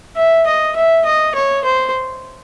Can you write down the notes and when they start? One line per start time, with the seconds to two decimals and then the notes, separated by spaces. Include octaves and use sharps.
0.17 E5
0.47 D#5
0.76 E5
1.06 D#5
1.35 C#5
1.64 C5